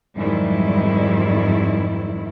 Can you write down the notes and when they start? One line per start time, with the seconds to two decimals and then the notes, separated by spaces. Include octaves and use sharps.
0.17 F2 G#2 D#3 F#3 G3 E4